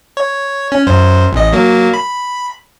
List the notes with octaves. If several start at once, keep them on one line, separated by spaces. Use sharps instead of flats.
C#5
C#4
F#2 C5
A1 D#5
F#3 A#3
B5